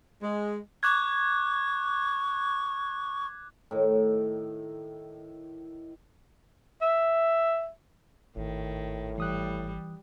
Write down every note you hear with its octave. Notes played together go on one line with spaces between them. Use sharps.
G#3
C#6 D6 F#6 G#6
A2 D#3
E5
G#1 A2 D#3
E3 G3 D#6 F#6